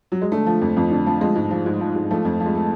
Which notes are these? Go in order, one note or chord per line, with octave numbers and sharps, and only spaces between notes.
F#3
G#3
D3 A3
F3
F2
F2
D3
F3
F3 G#3
G#2
F3
G#2
F3
G#2
F3 A3
F2
F3
G#3
A3